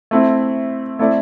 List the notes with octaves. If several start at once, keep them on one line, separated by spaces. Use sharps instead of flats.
A3 C4 E4
A3 C4 E4 A4 D5